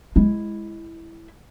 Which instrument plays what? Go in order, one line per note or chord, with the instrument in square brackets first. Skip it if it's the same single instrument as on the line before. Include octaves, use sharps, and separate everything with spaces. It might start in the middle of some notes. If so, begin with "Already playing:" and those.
[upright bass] G#3 E4